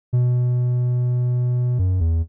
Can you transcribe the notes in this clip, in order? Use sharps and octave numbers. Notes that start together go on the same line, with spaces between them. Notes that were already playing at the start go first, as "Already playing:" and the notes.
B2
F#2
E2